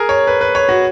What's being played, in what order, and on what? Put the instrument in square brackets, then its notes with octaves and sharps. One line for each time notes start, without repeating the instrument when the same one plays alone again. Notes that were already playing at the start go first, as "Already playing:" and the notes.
Already playing: [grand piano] G#4 A#4
C#5
B4
B4
C#5
F#4